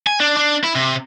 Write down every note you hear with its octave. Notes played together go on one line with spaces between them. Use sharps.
G#5
D4
D4
E4
C3